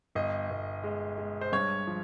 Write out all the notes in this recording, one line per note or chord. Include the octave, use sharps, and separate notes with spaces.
G1 D#5
G1
G#3
G#3
C5
G2 C#5
F3